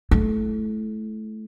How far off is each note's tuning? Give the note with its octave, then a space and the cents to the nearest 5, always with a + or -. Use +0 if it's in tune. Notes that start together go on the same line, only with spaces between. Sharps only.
A3 -25 E4 +0